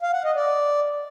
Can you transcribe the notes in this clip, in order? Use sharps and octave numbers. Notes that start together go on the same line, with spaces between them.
F5
F#5
D#5
D5